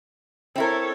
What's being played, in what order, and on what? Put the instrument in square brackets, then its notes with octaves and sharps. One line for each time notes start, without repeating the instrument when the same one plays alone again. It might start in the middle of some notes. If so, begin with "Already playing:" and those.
[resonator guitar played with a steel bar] C4 E4 A#4 [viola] A4 C#5